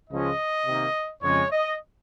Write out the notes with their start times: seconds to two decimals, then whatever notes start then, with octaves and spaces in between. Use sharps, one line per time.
0.10 C#2 C#3 F3 G#3 C#4 D#5
0.66 C3 D#3 A#3 D#4
1.22 F2 C#3 G#3 C#5
1.50 D#5